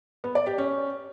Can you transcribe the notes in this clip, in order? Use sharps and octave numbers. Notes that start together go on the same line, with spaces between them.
B3
D5
G4
C#4